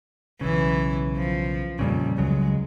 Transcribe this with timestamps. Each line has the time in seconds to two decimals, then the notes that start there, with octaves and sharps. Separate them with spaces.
0.41 B1 C#3 E3
1.16 F3
1.79 F2 A#2 C#3 G3
2.18 C#2 C#3 F#3 G#3